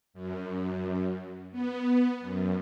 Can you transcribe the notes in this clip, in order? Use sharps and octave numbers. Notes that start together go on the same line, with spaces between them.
F#2
B3
F#2